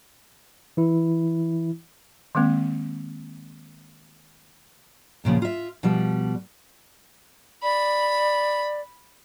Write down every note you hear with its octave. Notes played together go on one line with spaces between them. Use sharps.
E3 E4
D#3 G#3 A#3 C4
E2 A#2 C#3 F3
F4 E5
B2 F3 G3
D5 B5